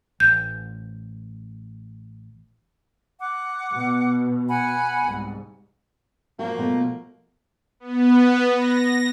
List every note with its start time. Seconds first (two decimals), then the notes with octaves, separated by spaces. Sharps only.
0.20 A1 G6
3.19 F#5 D6
3.72 B2
4.48 F#5 G#5 B5
5.03 C2 G#2
6.39 F3 A#3 F#4
6.58 B2 F3 A3
7.80 B3
8.52 A#6